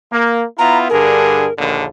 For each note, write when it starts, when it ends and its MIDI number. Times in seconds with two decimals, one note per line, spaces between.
0.12 0.43 58
0.59 0.88 59
0.59 0.88 64
0.59 0.88 65
0.59 0.78 82
0.89 1.46 43
0.89 1.46 50
0.89 1.46 68
0.89 1.53 70
1.58 1.85 34
1.58 1.85 39
1.58 1.85 50